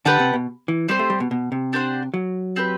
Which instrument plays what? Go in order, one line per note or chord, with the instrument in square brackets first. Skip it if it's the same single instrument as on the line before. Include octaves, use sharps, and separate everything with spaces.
[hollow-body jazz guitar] D3 [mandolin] G4 B4 F#5 A5
[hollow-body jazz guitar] C3
B2
E3
[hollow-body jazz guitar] G3 [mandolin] C4 G4 C5
[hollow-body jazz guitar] A3
G3
B2
B2
C3
[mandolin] D4 G4 C5 F#5
[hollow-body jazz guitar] F#3
[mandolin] C4 G4 B4